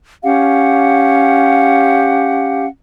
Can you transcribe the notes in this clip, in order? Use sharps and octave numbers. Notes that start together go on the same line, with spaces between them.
C#4 G4 F5 F#5